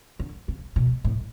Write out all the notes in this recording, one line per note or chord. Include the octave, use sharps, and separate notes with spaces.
D3
C#3
B2
A2